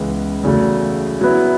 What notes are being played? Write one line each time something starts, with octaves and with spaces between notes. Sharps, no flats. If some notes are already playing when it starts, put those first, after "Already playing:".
Already playing: C#2 C#3 E3 B3
E2 C#3 F#3 A3
F#3 B3 E4